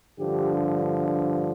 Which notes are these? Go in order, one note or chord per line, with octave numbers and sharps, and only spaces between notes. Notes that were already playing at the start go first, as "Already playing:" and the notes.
G2 D3 F3 G4